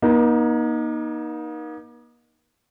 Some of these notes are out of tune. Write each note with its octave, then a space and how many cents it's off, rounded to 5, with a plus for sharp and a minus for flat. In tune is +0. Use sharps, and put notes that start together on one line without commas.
A#3 +40 D#4 +0